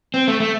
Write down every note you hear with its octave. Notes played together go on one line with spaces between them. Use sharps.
C4
A3
A3